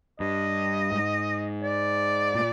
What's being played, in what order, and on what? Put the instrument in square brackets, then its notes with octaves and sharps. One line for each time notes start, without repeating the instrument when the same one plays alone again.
[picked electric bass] G2 [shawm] D#5
[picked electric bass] G#2
[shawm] D5
[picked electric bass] A#2